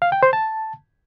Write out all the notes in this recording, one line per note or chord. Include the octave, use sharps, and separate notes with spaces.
F5
G5
C5
A5